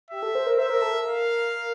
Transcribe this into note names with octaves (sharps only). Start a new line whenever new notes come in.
G4 E5
A4
C5
A#4
C5 E5
A#4
A4
A#4
F5